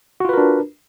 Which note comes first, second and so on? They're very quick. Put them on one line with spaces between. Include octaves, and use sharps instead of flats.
F#4 F4 B4 A#4 D4